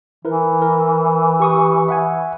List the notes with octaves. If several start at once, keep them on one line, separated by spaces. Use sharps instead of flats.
E3 E4 A#4 B4
A#4
G4 C#6 D#6
E5 F#5 G#5